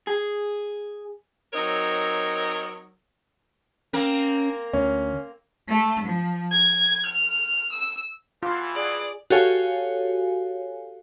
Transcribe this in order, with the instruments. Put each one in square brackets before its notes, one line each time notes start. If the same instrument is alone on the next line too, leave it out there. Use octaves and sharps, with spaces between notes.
[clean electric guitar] G#4
[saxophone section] F#3 C4 D#4 A#4 C#5
[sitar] A#3 C4 A#4 [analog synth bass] C#4
[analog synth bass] D2 [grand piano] C#4
[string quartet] A3
F3
G#6
F6
E6
[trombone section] E2 B2 E3 [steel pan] F4
[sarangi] G#4 [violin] D5
[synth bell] F#4 G4 A4 C#5 F5 G#5